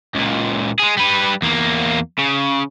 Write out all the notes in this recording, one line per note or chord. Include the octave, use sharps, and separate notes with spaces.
C#2 A#2
G#3 G#4
G3 B4
E2 A#3
C#3